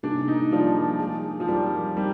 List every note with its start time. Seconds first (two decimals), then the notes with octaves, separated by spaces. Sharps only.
0.03 C3 G3 A#3 D4 D#4 G#4
0.28 D#4
0.51 F3 G3 A#3 D#4 G#4 D5
1.00 G#3 D4 G#4
1.40 F3
1.48 G3 G#3 C4 D#4 A#4 D5
1.97 G3 C4 D#4 A#4